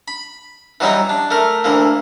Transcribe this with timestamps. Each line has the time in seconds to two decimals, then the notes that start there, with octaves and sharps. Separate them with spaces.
0.08 B5
0.80 E3 F#3 G3 D#4
1.09 D4
1.31 A3 A#4
1.64 D2 E3 A#3